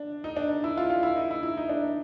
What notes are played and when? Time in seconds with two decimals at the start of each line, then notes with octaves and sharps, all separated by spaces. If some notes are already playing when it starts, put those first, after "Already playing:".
Already playing: D4
0.24 D#4
0.37 D4
0.64 E4
0.77 F4
0.90 F4
1.03 E4
1.16 D#4
1.31 E4
1.43 E4
1.57 D#4
1.69 D4